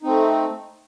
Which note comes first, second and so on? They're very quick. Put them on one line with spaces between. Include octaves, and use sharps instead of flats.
D#4 C4 A3